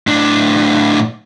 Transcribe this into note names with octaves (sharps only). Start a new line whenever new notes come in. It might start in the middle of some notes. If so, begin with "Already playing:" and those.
A2 D4